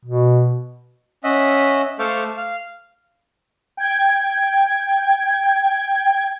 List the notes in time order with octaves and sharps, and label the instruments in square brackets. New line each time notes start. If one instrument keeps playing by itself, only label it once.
[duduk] B2
[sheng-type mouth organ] C#4 D#5 E5 F#5
A3 A4 C5 F5 C#6 D6
F5
[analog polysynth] G5 G#6